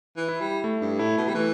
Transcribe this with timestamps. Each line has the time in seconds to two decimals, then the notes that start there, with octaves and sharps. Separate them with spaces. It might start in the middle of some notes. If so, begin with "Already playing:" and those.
0.16 E3
0.28 E4
0.41 G3
0.64 A3
0.81 G2
0.99 A2 E4
1.17 B2
1.29 G3
1.35 E3 A3